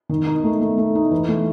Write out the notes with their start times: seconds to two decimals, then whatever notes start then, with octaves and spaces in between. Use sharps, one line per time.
0.09 D#3
0.26 D#4
0.44 A3
0.61 A3
0.78 A3
0.95 D#4
1.11 E3
1.29 A3